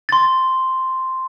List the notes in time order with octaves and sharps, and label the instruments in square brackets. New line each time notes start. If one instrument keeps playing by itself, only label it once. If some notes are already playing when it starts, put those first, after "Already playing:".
[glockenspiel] C6 A6